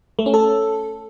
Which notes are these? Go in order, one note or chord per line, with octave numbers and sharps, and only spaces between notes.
A3
C#4
A4